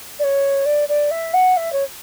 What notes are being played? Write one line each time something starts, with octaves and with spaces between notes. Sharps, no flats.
D5
C#5
D5
D5
E5
F#5
E5
C#5